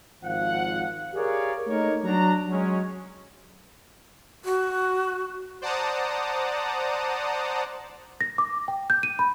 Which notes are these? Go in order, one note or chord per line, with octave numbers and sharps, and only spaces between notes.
G#1 F3 F5 F#5
G4 G#4 A#4 C#5 D5 F5
A3 A#3 D#4 A#4 C#5
F#3 D4 A#5
F#3 G#3 C#4
F#4
C5 D5 F#5 A5 A#5 D#6
A#6
D6
G5
G6
D#7
B5